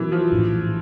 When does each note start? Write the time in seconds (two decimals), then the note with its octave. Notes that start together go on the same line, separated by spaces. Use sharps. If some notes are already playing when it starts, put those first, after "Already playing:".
Already playing: B2 E3 F#3 A#3 C#4
0.12 F3
0.31 A#1 A2 E3